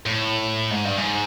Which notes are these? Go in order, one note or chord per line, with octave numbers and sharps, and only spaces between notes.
A2
G#2
G2
G#2